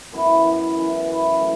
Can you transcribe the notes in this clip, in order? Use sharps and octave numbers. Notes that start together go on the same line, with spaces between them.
F#2 E3 B3 E4
F#2 E3 B3 E4
F#2 E3 B3 E4
F#2 E3 B3 E4
A2 E3 A3